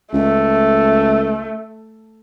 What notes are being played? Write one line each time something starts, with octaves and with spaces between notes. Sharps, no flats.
C#2 A3